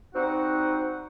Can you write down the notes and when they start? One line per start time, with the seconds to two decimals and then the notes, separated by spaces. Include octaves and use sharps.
0.15 G3 C4 D#4 F#4 F#5